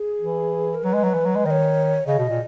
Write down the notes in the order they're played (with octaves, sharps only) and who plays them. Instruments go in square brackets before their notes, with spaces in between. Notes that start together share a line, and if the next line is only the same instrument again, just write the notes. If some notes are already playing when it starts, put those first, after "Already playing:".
Already playing: [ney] G#4
[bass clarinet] E3
[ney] A#4
[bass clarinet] F#3 [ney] B4
[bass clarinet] G#3
F#3
E3
F#3
G#3
[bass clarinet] D#3 [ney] D#5
[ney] C#5
[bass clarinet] C#3 [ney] D#5
[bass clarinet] B2
A#2